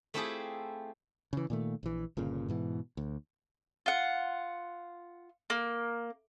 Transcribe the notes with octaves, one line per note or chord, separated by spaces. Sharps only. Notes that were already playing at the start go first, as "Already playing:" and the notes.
A3 C4 E4 F4 G4 G#4
C#3 E3
A#2 D#3 A3
A#1 E3
G1 A#2 C#3
G#2 B2 E3
D2
F4 F#5
A#3